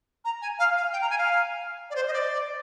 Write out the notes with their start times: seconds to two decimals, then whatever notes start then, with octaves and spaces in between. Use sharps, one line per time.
0.25 A#5
0.42 G#5
0.59 F5
0.76 F5
0.93 G5
1.02 A#5
1.10 G#5
1.18 F5
1.90 D5
1.96 C5
2.08 D#5
2.13 D5